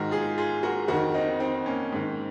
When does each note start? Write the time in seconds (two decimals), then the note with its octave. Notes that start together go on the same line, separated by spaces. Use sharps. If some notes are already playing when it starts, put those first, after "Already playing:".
Already playing: G#2 D#3 F#4 A#4
0.11 F4 G#4
0.38 F4 G#4
0.63 F#4 A#4
0.88 F2 D#3 F#4 A#4
1.14 C4 D#4
1.40 C4 D#4
1.66 A#3 C#4
1.92 G#2 D#3